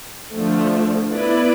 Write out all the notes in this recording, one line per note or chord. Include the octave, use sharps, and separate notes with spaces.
D3 F3 A3
B3 E4 B4 D5